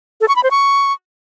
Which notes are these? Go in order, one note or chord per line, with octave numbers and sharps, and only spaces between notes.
A4
C#6
B5
C5
C#6